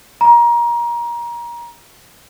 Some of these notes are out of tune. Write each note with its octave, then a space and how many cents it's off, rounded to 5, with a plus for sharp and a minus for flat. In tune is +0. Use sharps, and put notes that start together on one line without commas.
A#5 +25